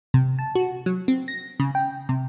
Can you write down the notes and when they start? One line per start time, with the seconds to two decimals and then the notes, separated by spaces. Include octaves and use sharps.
0.14 C3
0.39 A5
0.55 F#4
0.86 F#3
1.08 C4
1.28 A#6
1.60 C#3
1.75 G5
2.09 C3